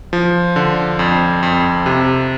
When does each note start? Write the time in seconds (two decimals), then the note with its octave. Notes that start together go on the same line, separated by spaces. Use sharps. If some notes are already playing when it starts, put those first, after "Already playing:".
0.13 F3
0.56 D3
0.99 F2
1.43 F2
1.86 C3